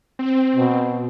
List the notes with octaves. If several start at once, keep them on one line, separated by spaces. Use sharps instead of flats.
C4
B2